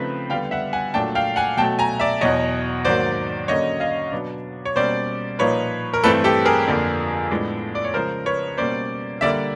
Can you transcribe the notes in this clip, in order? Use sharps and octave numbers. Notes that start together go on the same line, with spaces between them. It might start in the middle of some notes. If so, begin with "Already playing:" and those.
Already playing: C#3 F3 A3 C4 D#4 B4
D3 G3 B3 F5 G5
E5 F#5
F#5 G#5
A#2 F#3 A3 D4 G5 A5
F5 G5
F#5 G#5
B2 F#3 A3 G5 A5
G#5 A#5
D5 E5
E2 B2 F#3 C#5 D#5
G#2 D#3 F#3 A#3 C5 D5
D3 F#3 A#3 C#4 C#5 D#5
D#5 F5
B2 F#3 B3 D4
C#5
B2 G3 A#3 C#4 C5 D5
A#2 F3 A#3 D#4 B4 C#5
A#4
G2 E3 A3 C4 A4 B4
G4 A4
G#4 A#4
F2 D3 F3 A#3
A2 F3 G#3 B3 D4
D5
C#5
C#3 F3 G#3 A#4 C5
B4 C#5
B2 G3 A#3 C#4 C5 D5
D3 G3 A#3 D5 E5